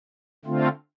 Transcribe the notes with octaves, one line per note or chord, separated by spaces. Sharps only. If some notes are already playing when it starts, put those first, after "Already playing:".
D3 A3 C4 F4